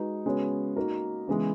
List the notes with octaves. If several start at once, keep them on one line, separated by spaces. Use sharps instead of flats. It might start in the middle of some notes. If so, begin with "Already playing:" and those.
Already playing: G#3 D#4 F#4 B4
C#3 G#3 B3 F#4 C#5
A#3 D#4 F#4 A#4
C#3 E3 G#3 B3